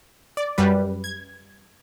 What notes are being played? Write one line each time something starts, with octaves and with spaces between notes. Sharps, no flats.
D5
F#2 G3 B4
G#6